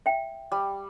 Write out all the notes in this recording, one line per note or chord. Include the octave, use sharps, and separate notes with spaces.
E5 G5
G3